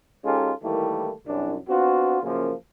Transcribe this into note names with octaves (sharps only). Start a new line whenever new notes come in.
G#3 C#4 D#4 F4 G4 A4
D#3 E3 G3 A3 A#3 E4
C2 F#2 D4
B3 C4 D4 F4 F#4
F#2 C#3 F3 A#3